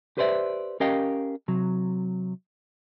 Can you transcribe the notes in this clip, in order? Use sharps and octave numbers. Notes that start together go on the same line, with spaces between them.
G4 B4 C5 D5 E5
C#4 G4 A#4 D#5 F5 G5
C3 F#3